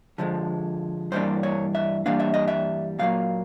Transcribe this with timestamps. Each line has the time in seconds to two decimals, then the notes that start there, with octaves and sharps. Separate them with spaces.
0.18 D3 F3 G#3
1.12 G2 E3 G3 A#3 D4 C5
1.43 C#5
1.75 E5
2.06 G2 E3 G3 A#3 D4 F5
2.20 E5
2.34 D#5
2.48 E5
2.99 A#2 F#3 A#3 F5